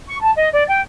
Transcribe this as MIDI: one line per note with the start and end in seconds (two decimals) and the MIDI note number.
0.08 0.18 85
0.22 0.33 81
0.37 0.49 75
0.52 0.63 74
0.67 0.80 79